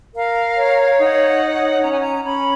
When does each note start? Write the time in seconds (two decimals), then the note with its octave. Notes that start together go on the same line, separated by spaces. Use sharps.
0.14 A#4 F5
0.56 C#5
0.99 D#4 F#5
1.41 C#5
1.82 C#4 A#5
1.92 G#5
2.00 A#5
2.24 C#4 B5